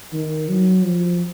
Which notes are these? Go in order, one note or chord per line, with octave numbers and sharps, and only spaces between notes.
D#3
F#3
F3